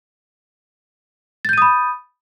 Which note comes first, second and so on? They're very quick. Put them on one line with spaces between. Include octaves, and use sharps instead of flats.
A6 G6 D#7 D#6 B5